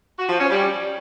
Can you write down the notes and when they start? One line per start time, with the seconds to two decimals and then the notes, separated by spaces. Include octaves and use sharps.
0.18 F#4
0.28 F3
0.39 C#4
0.49 G3